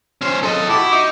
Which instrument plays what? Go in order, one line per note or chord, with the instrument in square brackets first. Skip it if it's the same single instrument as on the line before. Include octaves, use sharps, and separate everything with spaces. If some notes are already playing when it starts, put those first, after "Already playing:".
[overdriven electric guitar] C#4 C5
A4 D#5
[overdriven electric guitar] E4 [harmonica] F#4 G5 D6
[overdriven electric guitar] D#4